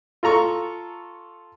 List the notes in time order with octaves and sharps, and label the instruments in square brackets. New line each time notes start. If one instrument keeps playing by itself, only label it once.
[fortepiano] F4 A4 A#5 C#6